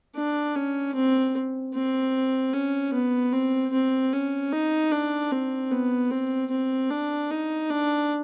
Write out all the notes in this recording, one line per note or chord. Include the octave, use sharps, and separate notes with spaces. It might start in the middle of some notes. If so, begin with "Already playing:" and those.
D4
C#4
C4
C4
C#4
B3
C4
C4
C#4
D#4
D4
C4
B3
C4
C4
D4
D#4
D4